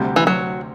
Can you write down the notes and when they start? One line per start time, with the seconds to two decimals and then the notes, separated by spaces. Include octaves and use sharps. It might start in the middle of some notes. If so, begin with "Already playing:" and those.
Already playing: D2 C3 G3
0.16 E3
0.27 F#3